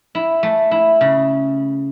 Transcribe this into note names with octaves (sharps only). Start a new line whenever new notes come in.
E4
A3
E4
C#3